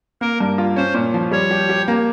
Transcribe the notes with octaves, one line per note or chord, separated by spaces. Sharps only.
A#3 A#4
G2
F4
C#4 C5
A#2
F3
G3 C#5
G4
G4
A#3